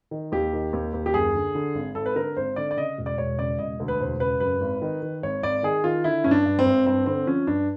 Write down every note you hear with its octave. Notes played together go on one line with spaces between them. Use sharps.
D#3
D#2 G4
D#3
D#2
D#2
G4
F#2 G#4
D3
D3
G#1
G#1 A4
B4
D3 A#4
G#1 C5
D3 D5
D5
C#3 D#5
E1
D5
E1 C#5
C#3 D5
E1 D#5
D2
B4
E1 C5
C#3 B4
F#2 B4
G#1
D#3
D#3
G#1 C#5
G#1 D5
D#3 G#4
D#3 F4
D3 E4
G2 C#4
D4
G2
C4
G#1
G2 C4
D3 C4
F3 C#4
G2 D4